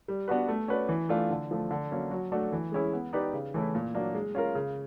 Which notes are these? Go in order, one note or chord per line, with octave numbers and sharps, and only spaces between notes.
G3
B3 D4 F#4 B4
A3
C#4 F#4 B4 D5
E3
A3 D4 F4
D3
F3 A3
D3
F#3 A#3 C#4
F#3
A3 D4 F#4 A4
E3
G#3 C#4 E4 G#4
B3
D#4 G4 B4 D5
C#3
E3 A3 C#4 E4
A#2
F#3 A#3 D4
G#3
C#4 F4 A#4
C#3